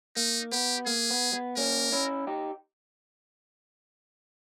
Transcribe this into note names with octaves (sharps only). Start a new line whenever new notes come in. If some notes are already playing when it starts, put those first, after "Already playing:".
A#3 D#4
B3 G4
A#3 G#4
B3
B3
A#3 C#4 A#4
C#4 E4
D#4 G4